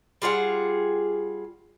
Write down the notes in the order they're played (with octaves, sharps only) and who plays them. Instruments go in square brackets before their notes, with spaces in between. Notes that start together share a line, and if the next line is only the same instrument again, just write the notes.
[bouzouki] G3 F4 G#4 F#5